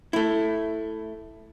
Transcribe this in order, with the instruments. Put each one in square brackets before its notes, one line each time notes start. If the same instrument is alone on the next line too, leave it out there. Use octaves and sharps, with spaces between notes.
[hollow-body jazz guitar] A3 E4